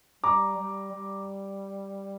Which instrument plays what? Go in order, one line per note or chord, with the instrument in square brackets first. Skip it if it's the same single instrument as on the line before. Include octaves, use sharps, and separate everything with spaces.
[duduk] G3 [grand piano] A#5 D6
[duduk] G3
G3